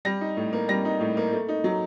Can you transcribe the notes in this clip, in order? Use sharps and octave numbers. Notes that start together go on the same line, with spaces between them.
G3 A#6
D#4
A2
A#3
G3 A#6
D#4
A2
A#3
A3
D#4
F#3